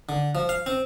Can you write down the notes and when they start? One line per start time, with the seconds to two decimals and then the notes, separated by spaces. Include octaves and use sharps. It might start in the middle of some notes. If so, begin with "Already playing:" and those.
0.09 D3
0.35 F3
0.49 F5
0.66 C4